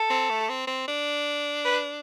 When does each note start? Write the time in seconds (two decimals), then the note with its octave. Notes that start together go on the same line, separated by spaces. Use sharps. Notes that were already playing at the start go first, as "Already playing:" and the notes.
Already playing: A4
0.10 C4
0.30 A3
0.49 C4
0.67 C4
0.88 D4
1.65 B4